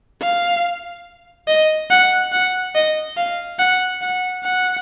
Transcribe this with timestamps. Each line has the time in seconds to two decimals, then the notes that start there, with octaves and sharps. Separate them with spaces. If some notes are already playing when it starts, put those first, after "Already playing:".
0.22 F5
1.48 D#5
1.90 F#5
2.33 F#5
2.75 D#5
3.17 F5
3.59 F#5
4.02 F#5
4.44 F#5